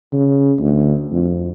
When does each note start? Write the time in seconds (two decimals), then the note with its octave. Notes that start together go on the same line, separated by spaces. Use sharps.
0.12 C#3
0.59 D2
1.12 F2